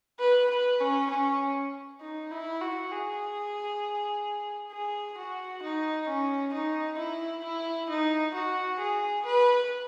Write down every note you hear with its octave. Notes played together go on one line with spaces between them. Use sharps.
B4
B4
C#4
C#4
D#4
E4
F#4
G#4
G#4
F#4
D#4
C#4
D#4
E4
E4
D#4
F#4
G#4
B4